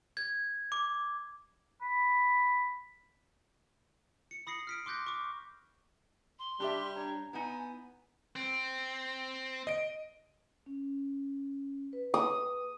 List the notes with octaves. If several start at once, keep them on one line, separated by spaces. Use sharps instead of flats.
G#6
D6
B5
C#7
B5 D#6 A#6 C7 C#7
F6 B6 D7
C6 D6 F#6 G6 A#6
C#6 D6
C6
G3 D4 G4 E5
D4 C#5 A#5
B3 D#4 E4 G#5
C4
D#5 D7
C#4
B4
D#6